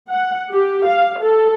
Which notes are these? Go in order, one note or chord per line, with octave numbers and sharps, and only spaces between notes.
F#5
G4
F5
A4